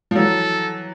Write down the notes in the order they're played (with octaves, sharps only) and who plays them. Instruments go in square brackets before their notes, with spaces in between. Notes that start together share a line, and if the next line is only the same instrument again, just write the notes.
[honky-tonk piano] F3
[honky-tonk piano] E3 F#3 [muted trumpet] A4